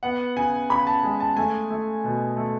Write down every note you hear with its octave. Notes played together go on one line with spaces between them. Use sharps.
B3 F#5
C#3 G#5
C#3 B5
A5
G#3
A5
A3 G#5
A3
B2
A3